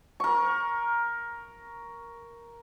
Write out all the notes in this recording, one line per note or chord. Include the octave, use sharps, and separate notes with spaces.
A#4 C#6